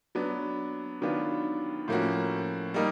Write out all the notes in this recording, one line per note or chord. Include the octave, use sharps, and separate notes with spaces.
F#3 B3 D4
D#3 F#3 B3 D4 F4
A2 F3 A#3 C#4 F#4
G3 A#3 D#4